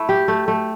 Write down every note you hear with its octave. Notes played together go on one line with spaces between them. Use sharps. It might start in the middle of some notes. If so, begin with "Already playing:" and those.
Already playing: A3 E4
G4
A3
A3